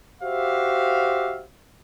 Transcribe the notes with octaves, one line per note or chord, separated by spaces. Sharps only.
F#4 G4 C5 E5 F5